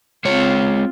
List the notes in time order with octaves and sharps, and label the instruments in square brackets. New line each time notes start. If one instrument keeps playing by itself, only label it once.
[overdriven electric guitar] G#3 C#5 [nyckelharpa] C4 F4